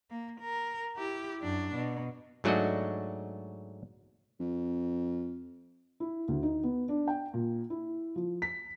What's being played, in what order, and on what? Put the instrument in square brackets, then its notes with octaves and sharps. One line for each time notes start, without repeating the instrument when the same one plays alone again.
[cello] A#3
A#4
E4 G4
F#2 D4
B2
[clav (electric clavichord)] G#2 F#3 A3 D4 F#4 D#5
[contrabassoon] F2
[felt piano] E4
D2
D#4
B3
D4
G5
A#2
E4
F3
B6